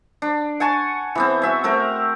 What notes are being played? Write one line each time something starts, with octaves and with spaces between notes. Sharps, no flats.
D4
F#5 G#5 A5 C#6
E3 B3 C4
F#4 E5 G#5
A3 C4 A#4